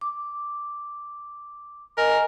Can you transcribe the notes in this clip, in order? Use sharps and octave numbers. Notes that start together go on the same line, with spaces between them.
D6
A#4 D#5 G#5